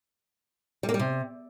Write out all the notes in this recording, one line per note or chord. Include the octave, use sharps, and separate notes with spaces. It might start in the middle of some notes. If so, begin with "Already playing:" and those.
G3
A#3
G3
C3